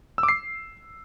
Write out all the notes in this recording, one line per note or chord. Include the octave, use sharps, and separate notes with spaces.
E6
D6
C7